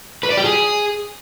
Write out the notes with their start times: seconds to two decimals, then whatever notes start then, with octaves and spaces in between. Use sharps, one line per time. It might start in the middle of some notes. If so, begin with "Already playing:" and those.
0.23 B4
0.30 D5
0.37 G4
0.44 G#4